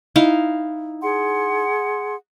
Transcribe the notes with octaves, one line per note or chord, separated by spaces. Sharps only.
D#4 E4 F5
G#4 F#5 C6